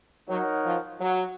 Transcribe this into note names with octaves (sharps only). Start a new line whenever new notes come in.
F#3 D#4 A#4 C#5 F#5
F3
F#3